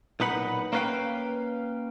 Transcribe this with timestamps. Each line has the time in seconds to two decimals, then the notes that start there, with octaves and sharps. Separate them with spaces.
0.20 B1 A#2 D#4 B4 F#5 B5
0.73 A#3 C#4 A#4 B4 F5 G5